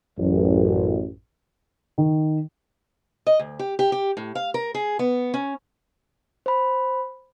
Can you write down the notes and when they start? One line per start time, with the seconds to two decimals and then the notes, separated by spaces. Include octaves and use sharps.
0.18 A1 F#2
1.98 D#3
3.27 D#5
3.39 D2
3.59 G4
3.79 G4
3.92 G4
4.17 A2
4.35 F5
4.54 A#4
4.75 G#4
4.99 B3
5.34 C#4
6.46 C5 B5